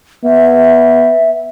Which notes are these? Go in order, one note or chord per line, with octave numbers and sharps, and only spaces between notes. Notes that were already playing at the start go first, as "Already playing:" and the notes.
B3 E5